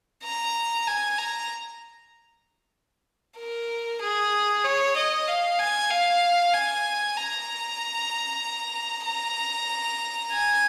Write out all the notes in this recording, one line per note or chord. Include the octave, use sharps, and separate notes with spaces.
A#5
G#5
A#5
A#4
G#4
C#5
D#5
F5
G#5
F5
G#5
A#5
A#5
G#5